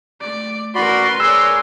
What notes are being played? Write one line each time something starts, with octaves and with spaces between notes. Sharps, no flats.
A3 D5
C#4 F#4 A#4 B4 D5 B5 C6
G#4 A#4 C#5 D5 G#5 E6